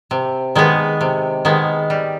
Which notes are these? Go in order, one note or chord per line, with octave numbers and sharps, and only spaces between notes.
C3
D#3 G#3 B3
C3
D#3 G#3 B3
G3